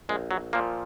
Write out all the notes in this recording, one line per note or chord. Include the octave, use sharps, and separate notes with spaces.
A#1 G#3
F#3
A#2 F3 A#3